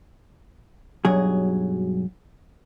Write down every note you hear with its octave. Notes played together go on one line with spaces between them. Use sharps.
B1 G2 F#3 G#4